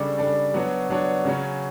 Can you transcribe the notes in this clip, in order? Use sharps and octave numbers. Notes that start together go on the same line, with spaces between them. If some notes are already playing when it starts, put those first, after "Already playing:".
Already playing: C#3 G3 D4 A4 D5
C#3 G3 D4 A4 D5
F#3 B3 D4 F#4 C#5
F#3 B3 D4 F#4 C#5
C#3 F#3 C#4